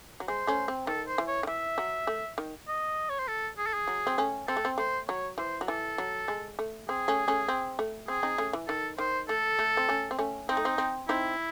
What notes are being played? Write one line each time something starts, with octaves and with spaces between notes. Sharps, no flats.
F#3
G#3 C5
A3 C#4
C4
D#3 A4
C5
E3
C#5
D#3
E3 E5
F#3
A3
D#3
D#5
C#5
C5
A4
G#4
A4
G#4
F#3
C4
A3 C#4
C4 A4
A3
C4
A3 C5
F#3 C#5
E3 C5
F#3
E3 A4
F#3
G#3
A3
C4 G#4
A3 C#4
A3 C#4
C4
A3
C4 G#4
C4 D#4
A3 C#4
E3
D#3 A4
D#3 C5
A3 A4
A3
C4
A3 C#4
C4
A3 C#4
C4 D#4
A3
C4
C4
C4 D#4 E4